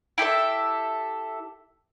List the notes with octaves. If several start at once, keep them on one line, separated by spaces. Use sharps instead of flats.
E4 G4 A4 E5